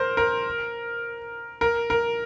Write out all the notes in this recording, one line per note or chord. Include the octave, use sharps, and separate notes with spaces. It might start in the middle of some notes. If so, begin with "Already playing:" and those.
Already playing: A#4 C5
A#4
A#4
A#4